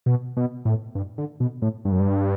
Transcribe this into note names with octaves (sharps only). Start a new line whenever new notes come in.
B2
B2
A2
G2
D3
B2
A2
G2
F#2
G2